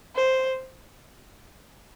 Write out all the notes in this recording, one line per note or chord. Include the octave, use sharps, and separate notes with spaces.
C5